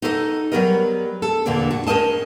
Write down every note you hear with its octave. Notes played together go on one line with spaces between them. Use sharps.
D#4 F#4 A4 C5 D#5
F#3 G3 B3 A#4 D#5
A4
E2 A#2 D3 A#3 C4 D4
F#4
C#4 A#4 C5 D#5 A5